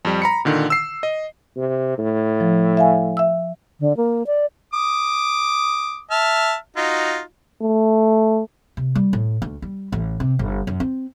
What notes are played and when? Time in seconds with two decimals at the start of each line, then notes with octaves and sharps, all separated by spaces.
0.05 F2 G3
0.22 A#5 B5 C#7
0.45 A#2 D3 D#3
0.70 E6 C7
1.03 D#5
1.57 C3
1.98 A2
2.40 F3
2.77 E5 F5 G#5
3.17 E5 E6
3.80 D3
3.97 A#3
4.27 D5
4.73 D6 D#6
6.11 E5 A5 F6
6.77 D#4 F4 F#4
7.62 A3
8.77 C3
8.96 G3
9.13 A2
9.42 D2
9.62 G3
9.92 A1
10.20 C3
10.39 G1
10.67 F#2
10.80 C4